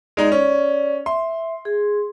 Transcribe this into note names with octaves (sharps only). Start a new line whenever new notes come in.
G#3 D#4 D5
C#4
E5 C6
G#4